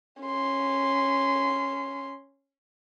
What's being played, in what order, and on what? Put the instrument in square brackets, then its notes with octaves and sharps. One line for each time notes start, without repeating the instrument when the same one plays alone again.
[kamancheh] C#4 C6